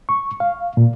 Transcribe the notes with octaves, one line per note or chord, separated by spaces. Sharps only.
C#6
F5
A#2